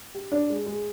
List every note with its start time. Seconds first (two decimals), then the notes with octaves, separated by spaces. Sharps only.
0.15 G4
0.32 D4
0.50 G#3
0.66 G#3